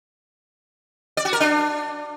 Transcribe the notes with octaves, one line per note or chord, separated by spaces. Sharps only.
D5
F#4
A#4
D4